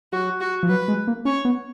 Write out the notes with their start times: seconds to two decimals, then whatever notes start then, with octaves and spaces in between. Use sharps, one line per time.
0.12 F#3 F#4
0.40 F#4
0.63 F3
0.69 F#3 B4
0.88 G#3
1.08 A#3
1.25 C#4 C#5
1.45 B3